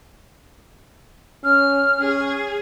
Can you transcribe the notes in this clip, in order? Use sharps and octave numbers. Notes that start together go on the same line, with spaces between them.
C#4 F6
C#4 G#4